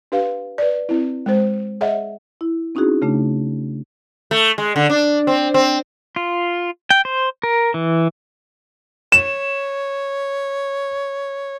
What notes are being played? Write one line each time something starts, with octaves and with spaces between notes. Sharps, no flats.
D4 G4 B4 F5
B4 D5
C4 E4
G#3 C5
G#4 C#5 D#5 E5 F#5
E4
C4 C#4 D#4 E4 F#4 G#4
C#3 A3 D4
A3
G#3
D3
D4
C4
C4
F4
G5
C5
A#4
E3
C#5 E7